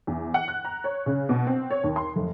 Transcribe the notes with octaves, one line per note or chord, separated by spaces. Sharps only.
E2
F#5
F#6
A#5
C#5
C#3
B2
C4
C#5
D#2
C6
F1